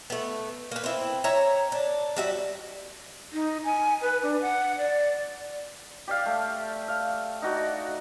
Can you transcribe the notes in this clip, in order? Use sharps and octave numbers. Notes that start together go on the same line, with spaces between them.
A3 B3
A#3 B4
C4 E4
C#5 E5 A#5
D4
G3 F#4 E5
D#4
G#5
B4
D4
F#5
D5
G4 D5 F5
A3
F5
D#4 F#4 D5